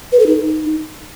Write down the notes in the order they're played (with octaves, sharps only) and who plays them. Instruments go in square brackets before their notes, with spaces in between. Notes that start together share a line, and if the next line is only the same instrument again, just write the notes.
[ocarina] B4
A4
D#4